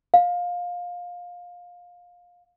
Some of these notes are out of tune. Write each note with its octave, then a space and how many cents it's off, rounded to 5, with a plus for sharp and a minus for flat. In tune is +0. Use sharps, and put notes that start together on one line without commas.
F5 +20